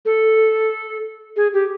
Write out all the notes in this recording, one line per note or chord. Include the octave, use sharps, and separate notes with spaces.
A4
G#4
G4